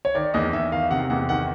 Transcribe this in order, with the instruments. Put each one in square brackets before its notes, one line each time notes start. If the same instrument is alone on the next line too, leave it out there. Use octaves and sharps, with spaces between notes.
[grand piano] C#5
D#3 D5
E2 D#5
E2 E5
D#3 F5
C3 F#5
E2 F#5
D#3 F#5